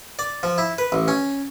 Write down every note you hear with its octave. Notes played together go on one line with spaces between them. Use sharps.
D5
F3
E4
B4
A1
C#4